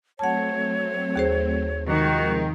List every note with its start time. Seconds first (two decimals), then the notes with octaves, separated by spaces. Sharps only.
0.19 F#3 A3 C4 C#5 F#5 A5
1.16 D#2 G#4 C5
1.87 C3 D#3 F3 G#3 F#4